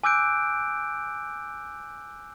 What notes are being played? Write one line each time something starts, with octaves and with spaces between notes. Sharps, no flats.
G#5 D6 E6 F#6 G6 D7